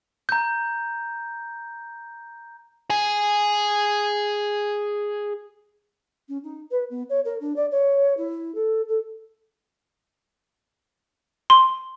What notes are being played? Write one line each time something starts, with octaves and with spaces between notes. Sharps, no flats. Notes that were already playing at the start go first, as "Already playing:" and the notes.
A#5 G6
G#4 G#5
C#4
D#4
B4
B3
C#5
A#4
D4
D5
C#5
E4
A4
A4
C6